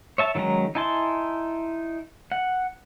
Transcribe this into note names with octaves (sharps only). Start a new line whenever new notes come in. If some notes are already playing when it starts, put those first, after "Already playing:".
C#5 E5 A5
D#3 F#3 G#3 C#4 A#5
D#4 E4 G#5 A5 C6
F#5